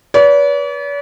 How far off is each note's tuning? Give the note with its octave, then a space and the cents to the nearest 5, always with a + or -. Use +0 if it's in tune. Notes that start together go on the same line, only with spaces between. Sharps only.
B4 -20 D5 -45